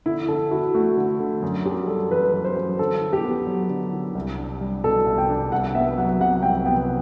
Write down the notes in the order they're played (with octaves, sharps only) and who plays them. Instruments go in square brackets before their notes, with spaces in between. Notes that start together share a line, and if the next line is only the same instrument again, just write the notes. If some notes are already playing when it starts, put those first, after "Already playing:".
[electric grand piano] D3 [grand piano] E4
[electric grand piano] D3 [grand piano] A4
[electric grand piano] E4 [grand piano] F#4
[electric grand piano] A3 [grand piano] F#4
[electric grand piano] D3
D3
F#2
[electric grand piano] F#2 [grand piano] G4
[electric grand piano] G3 [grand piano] A4
[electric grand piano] E3 [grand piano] B4
[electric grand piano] F#2
[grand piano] C5
[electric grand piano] F#2
[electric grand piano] D3 [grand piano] A4
[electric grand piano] E4
[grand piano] G4
[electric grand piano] B3
F#3
D3
E4
C2
D4
G3
[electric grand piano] B2 [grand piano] A4
[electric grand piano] C2
[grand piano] G5
[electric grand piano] D4
[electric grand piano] C2 [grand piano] F#5
[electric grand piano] B3 [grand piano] E5
[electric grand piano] F#3 [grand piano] F#5
[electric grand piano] C3 [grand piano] F#5
[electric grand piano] C2 [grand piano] G5
[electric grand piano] B3 [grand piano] G5